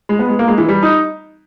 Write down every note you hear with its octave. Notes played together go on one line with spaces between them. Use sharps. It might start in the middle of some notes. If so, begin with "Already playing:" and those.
G#3
B3
G#3
A#3
G#3
E3
G3
D#4